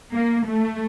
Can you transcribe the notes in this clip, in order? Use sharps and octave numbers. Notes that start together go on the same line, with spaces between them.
A#3
A3